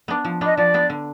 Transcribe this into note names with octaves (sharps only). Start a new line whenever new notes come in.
B3 D4
F3
B3 D4 D#5
F3 D5
B3 D4
D3